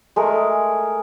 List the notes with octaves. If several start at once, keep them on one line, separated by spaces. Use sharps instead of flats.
G#3 A3 A#4